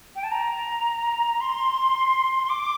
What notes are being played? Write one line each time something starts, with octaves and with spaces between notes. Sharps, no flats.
G5
A5
A#5
C6
D6